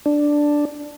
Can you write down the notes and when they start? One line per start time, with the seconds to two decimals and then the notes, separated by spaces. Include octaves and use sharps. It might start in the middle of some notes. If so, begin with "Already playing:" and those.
0.06 D4